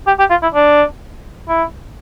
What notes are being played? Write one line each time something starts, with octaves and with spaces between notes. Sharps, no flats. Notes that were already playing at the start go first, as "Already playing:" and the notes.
G4
G4
F4
E4
D4
E4